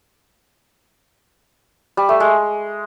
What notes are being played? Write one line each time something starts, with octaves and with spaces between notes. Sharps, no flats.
G3
A3
G#3